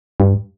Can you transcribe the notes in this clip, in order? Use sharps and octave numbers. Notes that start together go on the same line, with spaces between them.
G2